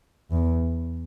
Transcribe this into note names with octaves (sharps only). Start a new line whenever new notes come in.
E2